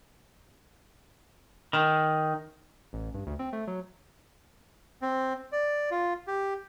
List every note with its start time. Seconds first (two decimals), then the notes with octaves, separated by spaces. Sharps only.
1.73 D#3
2.93 A1
3.14 G2
3.27 D2
3.39 C4
3.53 A3
3.67 F#3
5.02 C4
5.52 D5
5.91 F4
6.27 G4